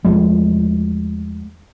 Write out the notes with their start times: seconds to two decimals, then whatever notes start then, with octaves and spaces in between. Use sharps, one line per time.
0.04 E2 F3 G#3 A3